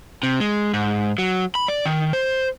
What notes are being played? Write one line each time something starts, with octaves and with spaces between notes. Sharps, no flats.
C3
G#3
G#2
F#3
B5
D5
D#3
C5